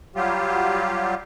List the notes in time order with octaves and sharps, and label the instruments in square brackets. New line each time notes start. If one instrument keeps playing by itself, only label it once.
[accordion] F#3 G3 F4 G4